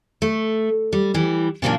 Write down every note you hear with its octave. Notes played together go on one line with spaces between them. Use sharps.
A3
G3
E3 G3
A#2 C#3 E3 F#3 A#3 D4